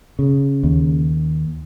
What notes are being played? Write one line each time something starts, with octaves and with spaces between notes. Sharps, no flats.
C#3
D#2